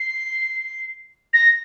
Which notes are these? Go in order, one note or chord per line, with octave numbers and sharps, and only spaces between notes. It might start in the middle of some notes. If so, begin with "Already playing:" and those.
Already playing: C7
A#6